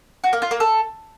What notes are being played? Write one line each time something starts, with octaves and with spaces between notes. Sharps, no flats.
F#4
A#3
F4
A#3
A4